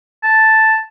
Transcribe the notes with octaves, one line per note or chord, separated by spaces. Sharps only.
A5